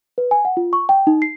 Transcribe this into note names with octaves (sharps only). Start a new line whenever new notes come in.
B4
G#5
F#5
F4
C#6
G5
D#4
C7